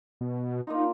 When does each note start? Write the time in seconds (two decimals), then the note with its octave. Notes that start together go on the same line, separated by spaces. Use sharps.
0.21 B2
0.67 A#3 D4 D#4 F4